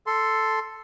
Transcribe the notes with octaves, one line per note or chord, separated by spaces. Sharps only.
A4 C6